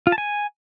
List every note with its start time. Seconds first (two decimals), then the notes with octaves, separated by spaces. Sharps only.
0.07 F4
0.12 A5
0.18 G#5